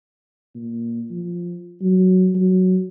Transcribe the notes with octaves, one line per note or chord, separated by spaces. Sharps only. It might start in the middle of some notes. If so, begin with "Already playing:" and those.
A#2
F3
F#3
F#3